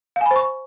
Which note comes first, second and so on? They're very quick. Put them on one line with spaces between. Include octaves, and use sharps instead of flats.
F5 G#5 B5 C5 C#6